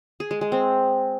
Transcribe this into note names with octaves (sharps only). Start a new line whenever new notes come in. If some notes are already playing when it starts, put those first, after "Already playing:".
G#4
G#3
G#3
C4